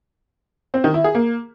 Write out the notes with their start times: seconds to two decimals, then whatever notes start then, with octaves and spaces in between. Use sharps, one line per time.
0.74 C4
0.84 D#3
0.94 E4
1.04 G#4
1.15 A#3